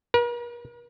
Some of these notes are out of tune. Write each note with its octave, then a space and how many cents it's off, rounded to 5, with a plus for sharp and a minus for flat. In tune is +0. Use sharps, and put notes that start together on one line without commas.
A#4 +45